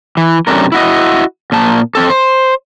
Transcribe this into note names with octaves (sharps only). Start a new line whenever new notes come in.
E3
F#2 C3 F#3 A3 D4 A#4
E4 F#4 D#5
A#2 A#3 A5
F2 C4 A4
C5